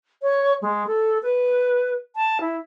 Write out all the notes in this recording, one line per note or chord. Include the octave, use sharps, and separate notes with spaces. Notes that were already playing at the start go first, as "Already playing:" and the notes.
C#5
G#3
A4
B4
A5
E4